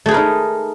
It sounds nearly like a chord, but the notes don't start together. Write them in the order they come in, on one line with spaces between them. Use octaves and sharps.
A3 G#4 B4 A#4 D#4